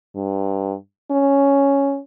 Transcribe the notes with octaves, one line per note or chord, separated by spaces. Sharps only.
G2
C#4